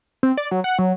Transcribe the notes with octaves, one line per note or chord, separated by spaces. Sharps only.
C4
D5
F#3
F#5
F#3